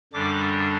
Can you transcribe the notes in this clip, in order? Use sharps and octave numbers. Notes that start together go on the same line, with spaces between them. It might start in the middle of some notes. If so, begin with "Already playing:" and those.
F#2 D3 G3 D4 D6